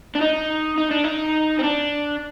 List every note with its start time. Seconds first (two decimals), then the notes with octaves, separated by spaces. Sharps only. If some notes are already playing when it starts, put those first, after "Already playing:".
0.15 D4
0.21 D#4
0.78 D#4
0.91 D4
1.04 D#4
1.59 C4
1.63 D4